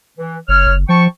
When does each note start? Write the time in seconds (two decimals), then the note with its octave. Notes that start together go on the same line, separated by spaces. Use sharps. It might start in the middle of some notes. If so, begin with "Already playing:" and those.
0.17 E3
0.48 F#1 C#5 F6
0.67 F#1
0.89 F3 G5 A5 C#6